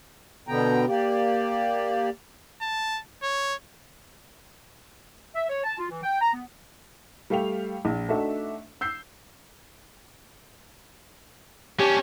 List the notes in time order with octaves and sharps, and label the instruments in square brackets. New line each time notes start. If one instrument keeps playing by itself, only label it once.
[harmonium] B2 D3 B3 G5 A#5
A#3 G4 D5
[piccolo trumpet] A5
C#5
[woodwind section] E5
C#5
A5
F4
E3
G5
A#5
B3
[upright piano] G3 A3 F5 G5 F7
A#1
A3 D4 D#4 F#4 A4 E5
E6 G6 C7
[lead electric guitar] C#4 D4 [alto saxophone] G4